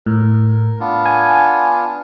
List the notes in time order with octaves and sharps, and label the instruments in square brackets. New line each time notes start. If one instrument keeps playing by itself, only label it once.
[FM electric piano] A2 [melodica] A#4
[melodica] B3 D4 F4
[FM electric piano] G#5